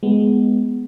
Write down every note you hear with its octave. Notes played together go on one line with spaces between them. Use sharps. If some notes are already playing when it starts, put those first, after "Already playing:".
G#3 B3